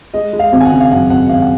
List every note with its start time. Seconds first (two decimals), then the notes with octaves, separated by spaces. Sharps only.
0.14 G#3 D#5
0.33 G#3
0.39 F5
0.52 G#1
0.61 G#5
0.65 F#5
0.71 C#3
0.81 F5
0.92 F#2 F#5
1.10 G#1 F#5
1.29 G#1 F5
1.41 F#5